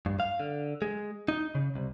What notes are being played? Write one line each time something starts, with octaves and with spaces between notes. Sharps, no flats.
G2
F5
D3
G#3
D#4
C#3
C2